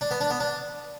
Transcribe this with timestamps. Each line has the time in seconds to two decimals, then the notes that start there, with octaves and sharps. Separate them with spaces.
0.01 D4
0.11 B3
0.21 D4
0.30 B3
0.40 D4